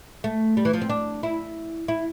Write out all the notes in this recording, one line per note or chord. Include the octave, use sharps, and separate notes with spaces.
A3
G3
E3
F3
C4
D4
E4
E4